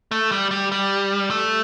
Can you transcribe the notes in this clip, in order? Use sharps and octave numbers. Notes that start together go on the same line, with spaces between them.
A3
G3
G3
G3
A3